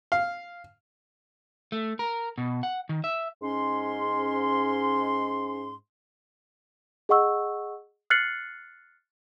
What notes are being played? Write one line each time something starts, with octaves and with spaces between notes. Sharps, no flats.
F5
A3
A#4
B2
F#5
D#3
E5
G#2 C#4 C6
G#4 D#5 F#5 C#6 E6
F6 F#6 A6 C7 C#7 F#7